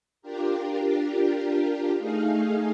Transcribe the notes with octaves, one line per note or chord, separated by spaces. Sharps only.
D4 F4 G4 A#4
A3 D#4 G#4 F5